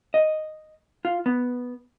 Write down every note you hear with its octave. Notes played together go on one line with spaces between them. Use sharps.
D#5
F4
B3